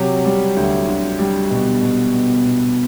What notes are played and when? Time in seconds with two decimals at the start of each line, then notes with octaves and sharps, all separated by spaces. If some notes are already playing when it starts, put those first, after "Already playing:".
Already playing: C3 F#3 G4
0.25 G3
0.57 D2
0.88 D3
1.19 G3
1.50 B2
1.82 B2
2.13 B2
2.44 B2